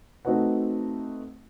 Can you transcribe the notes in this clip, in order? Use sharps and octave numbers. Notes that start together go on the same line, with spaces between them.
A3 C4 D#4 F#4 B4 F#5